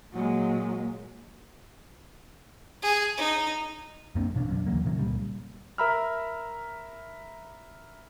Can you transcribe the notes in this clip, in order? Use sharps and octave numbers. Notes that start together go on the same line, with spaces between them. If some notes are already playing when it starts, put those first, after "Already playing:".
A#2 F#3 G#3
G#4
D#4
F#2 A#3 C4 D4
A1 B2 C#4 D4
B1 F#2 F3 D4
D#2 E3 F#3 A#3
A#2 C#3 E3 F#3
C#2 A#2 G3
A#4 E5 A#5 B5 E6 F6